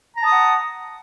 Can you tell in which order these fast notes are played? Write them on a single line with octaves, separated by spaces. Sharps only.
A#5 A5 D#6 F#5